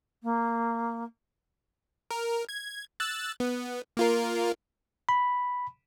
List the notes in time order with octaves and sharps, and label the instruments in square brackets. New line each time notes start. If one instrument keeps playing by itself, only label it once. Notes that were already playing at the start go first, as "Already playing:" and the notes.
[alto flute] A#3
[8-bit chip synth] A#4
G#6
E6 F#6 A6
B3
A#3 F4 A#4
[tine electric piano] B5